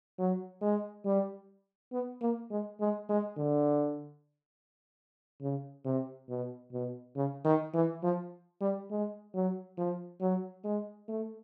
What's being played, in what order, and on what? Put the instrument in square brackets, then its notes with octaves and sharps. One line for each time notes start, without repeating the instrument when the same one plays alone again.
[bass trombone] F#3
G#3
G3
B3
A#3
G#3
G#3
G#3
D3
C#3
C3
B2
B2
C#3
D#3
E3
F3
G3
G#3
F#3
F3
F#3
G#3
A3